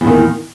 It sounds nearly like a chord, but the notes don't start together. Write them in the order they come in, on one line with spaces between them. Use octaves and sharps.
E2 A#2 D#3